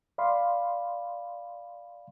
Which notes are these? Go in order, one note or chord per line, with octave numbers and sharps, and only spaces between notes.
D5 F5 B5 C6